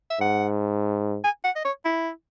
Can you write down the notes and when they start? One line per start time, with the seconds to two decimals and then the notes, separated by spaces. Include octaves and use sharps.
0.10 E5
0.21 G#2 F#5
1.24 G#5
1.44 F#5
1.56 D#5
1.65 C#5
1.85 E4